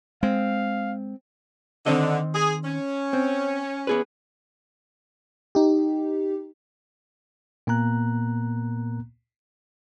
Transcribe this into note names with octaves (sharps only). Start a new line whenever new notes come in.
G#3 C4 F5
D3 D#3 C4 D#5
G#4
C#4
C4
B3 G#4 B4
D#4 G4
A#2 A#3 B3 A#5 F#6